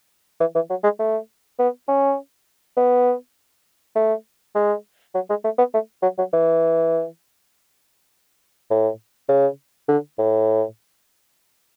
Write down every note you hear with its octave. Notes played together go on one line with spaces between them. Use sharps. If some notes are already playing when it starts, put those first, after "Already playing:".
E3
E3
F#3
G#3
A3
B3
C#4
B3
A3
G#3
F#3
G#3
A3
B3
A3
F#3
F#3
E3
A2
C#3
D3
A2